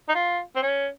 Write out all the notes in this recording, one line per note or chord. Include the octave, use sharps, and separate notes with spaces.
D#4
F4
C4
C#4